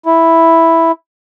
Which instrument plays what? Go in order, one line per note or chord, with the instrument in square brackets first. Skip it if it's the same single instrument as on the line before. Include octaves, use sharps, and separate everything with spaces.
[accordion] E4